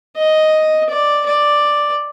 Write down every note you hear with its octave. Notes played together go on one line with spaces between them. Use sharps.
D#5
D5
D5